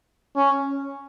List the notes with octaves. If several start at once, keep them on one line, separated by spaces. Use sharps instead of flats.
C#4